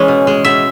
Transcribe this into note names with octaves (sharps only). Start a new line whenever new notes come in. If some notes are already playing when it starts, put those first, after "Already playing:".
Already playing: E3 G#3 C#4
B2
G#3
B2 E5